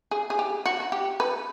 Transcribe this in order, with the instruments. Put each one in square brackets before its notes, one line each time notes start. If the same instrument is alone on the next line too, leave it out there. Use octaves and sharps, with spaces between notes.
[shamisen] G#4
G#4
G4
F#4
F#4
G4
B4